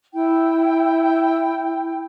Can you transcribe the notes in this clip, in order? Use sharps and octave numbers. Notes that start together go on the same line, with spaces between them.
E4 G5